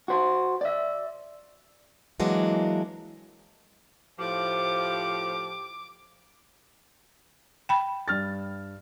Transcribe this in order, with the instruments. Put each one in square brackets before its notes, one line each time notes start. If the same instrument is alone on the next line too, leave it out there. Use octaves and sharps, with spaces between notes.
[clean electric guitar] F#4 C5
D5 E5
[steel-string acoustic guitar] E3 F#3 G#3 A#3 D4
[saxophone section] A2 F3 [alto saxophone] G4 [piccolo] D6
[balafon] G5 B5
[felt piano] G2 F6 A6